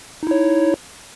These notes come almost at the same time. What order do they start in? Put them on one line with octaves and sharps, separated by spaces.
D#4 E4 C#5